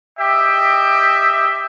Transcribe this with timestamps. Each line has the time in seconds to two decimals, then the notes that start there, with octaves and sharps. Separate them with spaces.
0.20 G4 D#5 E5 G5